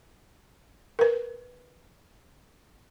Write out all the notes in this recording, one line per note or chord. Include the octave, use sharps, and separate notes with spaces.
A#4 B4